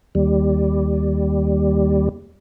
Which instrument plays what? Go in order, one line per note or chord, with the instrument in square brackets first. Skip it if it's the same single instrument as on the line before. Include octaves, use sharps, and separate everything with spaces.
[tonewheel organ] D#2 G3